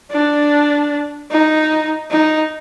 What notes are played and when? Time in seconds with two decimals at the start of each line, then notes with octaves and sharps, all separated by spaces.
0.12 D4
1.31 D#4
2.11 D#4